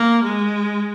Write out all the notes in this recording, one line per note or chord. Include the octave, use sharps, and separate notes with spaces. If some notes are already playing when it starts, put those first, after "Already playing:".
Already playing: A#3
G#3